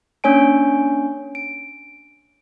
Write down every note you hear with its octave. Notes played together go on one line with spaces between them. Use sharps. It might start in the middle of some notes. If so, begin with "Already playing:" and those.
A#3 C#4 D4 C#5 G#5 D7
D7